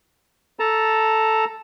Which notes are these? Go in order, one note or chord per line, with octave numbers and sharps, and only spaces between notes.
A4 A5 A#5